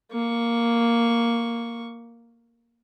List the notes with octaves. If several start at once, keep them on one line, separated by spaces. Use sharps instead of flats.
A#3 C#6